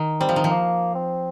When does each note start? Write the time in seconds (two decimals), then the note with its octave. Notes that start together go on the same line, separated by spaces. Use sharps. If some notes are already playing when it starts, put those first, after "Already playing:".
Already playing: D#3
0.20 G3 C4
0.29 F3
0.36 D#3
0.44 F3
0.51 A#3
0.95 C4